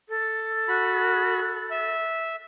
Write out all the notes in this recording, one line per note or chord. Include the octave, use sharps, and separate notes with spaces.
A4
F#4 B5
E5